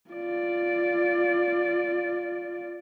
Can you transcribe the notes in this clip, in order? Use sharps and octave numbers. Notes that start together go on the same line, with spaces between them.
F4 D5